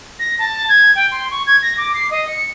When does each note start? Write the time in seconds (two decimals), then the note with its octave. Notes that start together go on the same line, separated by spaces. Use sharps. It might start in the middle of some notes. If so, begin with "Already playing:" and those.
0.19 A#6
0.39 A5
0.69 G#6
0.95 G5
1.11 C6
1.31 C#6
1.46 G#6
1.62 A#6
1.77 D6
1.94 C7
2.11 D#5
2.28 C#7